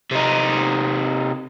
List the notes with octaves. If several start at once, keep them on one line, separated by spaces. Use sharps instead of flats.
C3 D#4